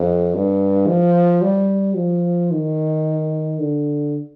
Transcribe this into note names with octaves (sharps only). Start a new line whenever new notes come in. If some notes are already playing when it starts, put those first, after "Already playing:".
Already playing: F2
G2
F3
G3
F3
D#3
D3